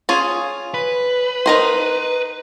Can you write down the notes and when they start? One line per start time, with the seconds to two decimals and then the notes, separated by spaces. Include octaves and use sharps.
0.09 C#4 F4 G#4
0.74 B4
1.46 D#4 A#4 C5